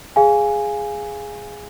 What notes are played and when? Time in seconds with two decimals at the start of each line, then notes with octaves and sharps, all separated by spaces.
0.16 G#4 F5 G#5